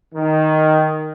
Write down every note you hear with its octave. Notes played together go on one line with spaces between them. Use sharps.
D#3